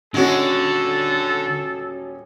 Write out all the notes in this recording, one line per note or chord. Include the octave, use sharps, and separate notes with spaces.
D#1 D3 G#3 C#4 F#4 A4